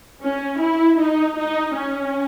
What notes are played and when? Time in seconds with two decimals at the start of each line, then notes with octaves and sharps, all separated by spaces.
0.23 C#4
0.61 E4
1.00 D#4
1.39 D#4
1.77 C#4